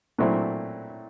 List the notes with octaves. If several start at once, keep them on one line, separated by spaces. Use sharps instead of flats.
A#2 F#3 A3 C4 E4